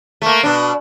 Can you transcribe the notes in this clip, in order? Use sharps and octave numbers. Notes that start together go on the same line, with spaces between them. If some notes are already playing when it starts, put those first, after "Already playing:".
A3 A#3
B2 D4